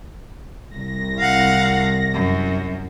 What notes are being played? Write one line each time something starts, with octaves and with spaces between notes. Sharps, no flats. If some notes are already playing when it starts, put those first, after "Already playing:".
C2 A#6
F5 F#5
F#2